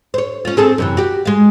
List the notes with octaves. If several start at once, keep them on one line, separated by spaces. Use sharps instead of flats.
C5 C#5
C#4 F4
C4 G#4 A4
F#2 C3 E3
F#4 G4
G#3 F5